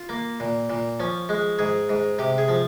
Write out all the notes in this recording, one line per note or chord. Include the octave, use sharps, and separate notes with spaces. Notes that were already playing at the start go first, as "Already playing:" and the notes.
Already playing: F4
A#3
A#2
A#2
F3 C#4
G#3
G#2 G#4
G#2
C3 G4
G#4
F3